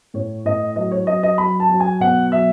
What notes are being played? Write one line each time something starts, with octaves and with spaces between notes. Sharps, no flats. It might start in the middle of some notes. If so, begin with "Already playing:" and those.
A2 C#5
A2 D#5
F#3 D#5
C#5
F#3 D#5
D#5
F#3 B5
A5
F#3
G#5
B2 F#5
F#3 E5